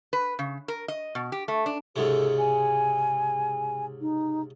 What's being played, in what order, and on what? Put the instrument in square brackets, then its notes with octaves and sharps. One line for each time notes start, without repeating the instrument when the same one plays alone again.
[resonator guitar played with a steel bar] B4
C#3
A#4
D#5
B2
G4
A3
D4
[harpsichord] C#2 G#2 C3 [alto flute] A4
[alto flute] G#5
D#4